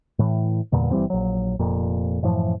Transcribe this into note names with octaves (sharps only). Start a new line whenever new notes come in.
A2 E3
E2 G2 A#2 D3
G1 E3 G3 C4
A#1 F#3
F1 F2 A#2
F#2 A2 E3 F3